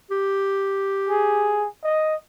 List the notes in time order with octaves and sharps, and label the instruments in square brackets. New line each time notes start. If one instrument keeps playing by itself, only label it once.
[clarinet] G4
[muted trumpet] G#4
D#5